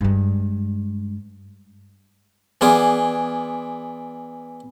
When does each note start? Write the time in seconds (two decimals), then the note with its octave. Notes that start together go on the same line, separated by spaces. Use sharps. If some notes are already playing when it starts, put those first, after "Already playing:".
0.01 G2 G#3
2.61 E3 B3 F4 G#4 D5